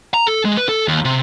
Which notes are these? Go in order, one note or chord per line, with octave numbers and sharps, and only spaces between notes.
A#5
A4
G#3
B4
A4
D#2
C3